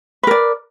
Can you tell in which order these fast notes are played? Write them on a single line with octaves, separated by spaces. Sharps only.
B4 A#4 D5